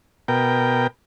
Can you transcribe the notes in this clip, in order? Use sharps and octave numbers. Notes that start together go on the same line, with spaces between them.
B2 A#4 G5